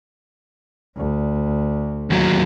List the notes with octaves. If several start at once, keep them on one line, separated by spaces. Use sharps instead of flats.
D2
D#2 F#3